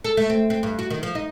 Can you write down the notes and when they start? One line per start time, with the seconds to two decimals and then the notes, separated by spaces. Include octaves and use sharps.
0.04 A4
0.17 A3
0.30 C4
0.50 C4
0.63 G2
0.79 F#4
0.90 D#3
1.03 F3
1.15 D#4